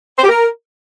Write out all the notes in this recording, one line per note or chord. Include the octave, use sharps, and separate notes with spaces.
C5
G4
A#4